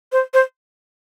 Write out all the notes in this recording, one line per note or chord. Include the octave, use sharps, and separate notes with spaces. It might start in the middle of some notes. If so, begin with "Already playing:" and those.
C5
C5